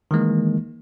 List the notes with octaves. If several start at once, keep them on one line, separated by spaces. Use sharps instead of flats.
D#3 E3 G#3 A#3